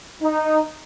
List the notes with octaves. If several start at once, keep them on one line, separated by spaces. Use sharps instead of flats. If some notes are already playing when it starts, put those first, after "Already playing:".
D#4